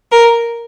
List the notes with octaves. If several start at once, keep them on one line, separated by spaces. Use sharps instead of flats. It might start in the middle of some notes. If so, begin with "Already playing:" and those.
A#4